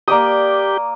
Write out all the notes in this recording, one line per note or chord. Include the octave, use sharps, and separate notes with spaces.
A#3 G4 D5 D#6